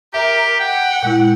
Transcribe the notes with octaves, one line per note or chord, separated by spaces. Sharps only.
G4 A#4 E5
F#5 G5
A#2 G#3 E4